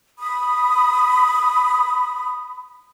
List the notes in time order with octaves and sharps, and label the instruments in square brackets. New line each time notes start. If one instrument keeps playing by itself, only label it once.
[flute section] B5 D#6